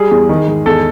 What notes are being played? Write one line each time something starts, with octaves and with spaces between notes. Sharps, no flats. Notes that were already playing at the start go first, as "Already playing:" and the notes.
Already playing: G3 G#4
E2
D#3
G#2
E2 A4